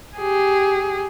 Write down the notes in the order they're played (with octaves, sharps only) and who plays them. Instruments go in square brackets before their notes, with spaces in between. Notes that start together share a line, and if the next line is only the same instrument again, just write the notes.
[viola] G4 G#4